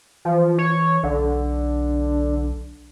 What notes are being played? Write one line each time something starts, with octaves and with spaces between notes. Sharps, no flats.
E3 F3
C#5
B1 D3